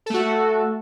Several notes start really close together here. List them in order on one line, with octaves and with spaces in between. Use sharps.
A4 A3 F#4